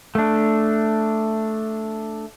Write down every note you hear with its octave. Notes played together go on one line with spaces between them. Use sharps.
A3 D4